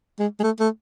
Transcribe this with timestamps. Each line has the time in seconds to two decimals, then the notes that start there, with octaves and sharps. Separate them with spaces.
0.20 G#3
0.40 G#3
0.44 A3
0.60 A3